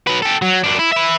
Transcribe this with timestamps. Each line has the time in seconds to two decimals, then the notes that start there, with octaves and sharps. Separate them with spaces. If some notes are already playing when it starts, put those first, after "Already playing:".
0.07 F#3 B4
0.22 G4 A4
0.42 F#3
0.64 F#2 D4
0.79 E4
0.93 B4 E5